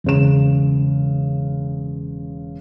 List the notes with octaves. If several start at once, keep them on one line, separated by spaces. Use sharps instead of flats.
E1 C#3 E7